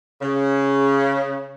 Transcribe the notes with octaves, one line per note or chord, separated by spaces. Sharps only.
C#3